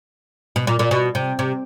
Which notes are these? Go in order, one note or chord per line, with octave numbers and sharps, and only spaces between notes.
B2
A#2
A#2
B2
C3
C3